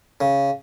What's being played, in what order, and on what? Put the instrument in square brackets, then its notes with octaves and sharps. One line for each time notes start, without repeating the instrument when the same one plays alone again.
[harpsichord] C#3